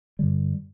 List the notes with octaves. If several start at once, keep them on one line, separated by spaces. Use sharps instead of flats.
G2 D3 G3